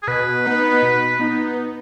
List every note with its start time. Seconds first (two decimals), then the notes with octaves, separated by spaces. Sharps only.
0.03 G#4
0.08 B2 B4
0.45 B3 D#4
0.82 B2
1.19 B3 D#4